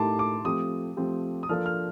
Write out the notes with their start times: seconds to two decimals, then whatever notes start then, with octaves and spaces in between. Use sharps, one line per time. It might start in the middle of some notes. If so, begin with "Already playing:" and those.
Already playing: A2 A3 D#4 G4 A#4 A5 C6 D6
0.19 D6
0.45 F3 A3 C4 G4 D#6
0.97 F3 A3 C4 G4
1.43 D#6
1.49 F3 A#3 D4 A4 F6
1.66 F6